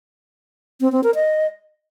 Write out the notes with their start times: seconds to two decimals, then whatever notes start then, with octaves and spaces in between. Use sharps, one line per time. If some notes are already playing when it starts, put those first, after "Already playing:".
0.81 C4
0.92 C4
1.04 A#4
1.15 D#5